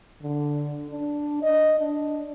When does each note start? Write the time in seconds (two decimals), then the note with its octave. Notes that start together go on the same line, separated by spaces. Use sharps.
0.22 D3
0.90 D4
1.42 D#5
1.80 D4